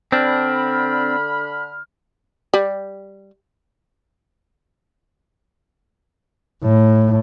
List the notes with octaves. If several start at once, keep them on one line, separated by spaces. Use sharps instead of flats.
D3 C4 D4 B5 F6
G3
A2